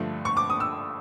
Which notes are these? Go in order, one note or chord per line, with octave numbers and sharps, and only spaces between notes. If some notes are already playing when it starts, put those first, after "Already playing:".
Already playing: G2 D3 F3 A3
C#6
D6
D#6
E6